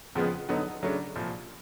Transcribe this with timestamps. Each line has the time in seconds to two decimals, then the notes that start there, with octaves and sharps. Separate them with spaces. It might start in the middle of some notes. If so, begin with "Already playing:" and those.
0.15 F2 C#3 F3 G#3 B3
0.49 D3 F#3 B3 D#4
0.83 C#3 F#3 A3 D4
1.16 C2 A#2 F3